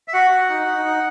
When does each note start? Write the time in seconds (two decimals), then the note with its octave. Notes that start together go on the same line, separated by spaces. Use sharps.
0.08 E5
0.13 F#4 F#5
0.31 F#4
0.49 D#4
0.67 D#4
0.85 D#4